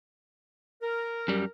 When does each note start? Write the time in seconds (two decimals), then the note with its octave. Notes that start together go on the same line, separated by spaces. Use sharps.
0.82 A#4
1.28 F#2 G3